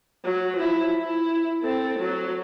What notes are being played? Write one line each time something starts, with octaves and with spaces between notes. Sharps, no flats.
F#3
F3 E4
E4
C4 A4
F#3